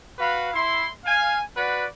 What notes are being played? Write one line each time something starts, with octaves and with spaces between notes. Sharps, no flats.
F#4 B4 F5 B5
E4 C6
F5 G#5
F#4 B4 D5 F#5